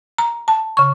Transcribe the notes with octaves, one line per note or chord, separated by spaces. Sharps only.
A#5
A5
C#3 C#6